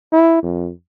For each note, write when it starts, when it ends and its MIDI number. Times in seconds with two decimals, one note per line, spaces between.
0.12 0.38 64
0.43 0.70 41